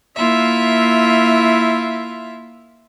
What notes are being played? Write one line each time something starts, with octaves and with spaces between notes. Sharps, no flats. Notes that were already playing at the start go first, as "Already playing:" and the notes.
A#3 E4 F4 E5